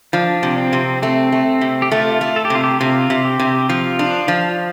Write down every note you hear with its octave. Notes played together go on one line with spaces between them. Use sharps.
F3 D4
C3
C4
C3
A3 C4
A3
C3
G4
A3 F4
A3
A4
G4
C3 F4
G4
C3 F4
C3
G4
C3
F3 F4
D4
F3